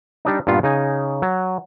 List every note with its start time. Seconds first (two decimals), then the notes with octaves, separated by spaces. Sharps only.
0.25 G3 D4 D#4
0.47 G2 A#2 B3 F4
0.63 C#3 D#4 G#5
1.22 F#3